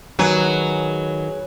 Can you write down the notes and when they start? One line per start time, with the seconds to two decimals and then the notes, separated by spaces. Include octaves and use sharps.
0.19 D#3 F#3 G#4 B4